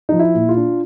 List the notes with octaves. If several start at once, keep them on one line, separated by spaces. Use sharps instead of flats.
F3 D#4
E4
A#2
F4
D4